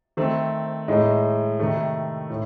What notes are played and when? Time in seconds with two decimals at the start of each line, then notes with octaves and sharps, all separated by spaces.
0.17 D#3 A3 C4
0.88 A2 G#3 D#4
1.59 C3 D#3 A3
2.30 A2